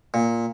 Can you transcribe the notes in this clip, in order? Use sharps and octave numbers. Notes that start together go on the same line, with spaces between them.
A#2